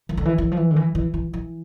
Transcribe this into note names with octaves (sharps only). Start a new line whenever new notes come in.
E3
D3
E3
E3
F3
E3
D3
E3
E3
E3
E3